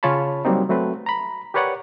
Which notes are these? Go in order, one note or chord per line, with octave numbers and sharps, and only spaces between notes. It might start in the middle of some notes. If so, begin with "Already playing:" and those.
C#3 C#4 F4 C#5 A5 B5
F#3 G3 A#3 C4 D#4
F#3 A3 C4 B4
A#5 B5
G4 A#4 B4 C#5 D5 F#5